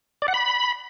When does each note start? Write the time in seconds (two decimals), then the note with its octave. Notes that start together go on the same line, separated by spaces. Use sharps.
0.22 D5
0.28 F#5
0.34 B5